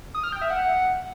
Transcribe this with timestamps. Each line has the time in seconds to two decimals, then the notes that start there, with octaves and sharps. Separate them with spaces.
0.15 D#6
0.24 F6
0.32 G5
0.41 E5
0.50 F#5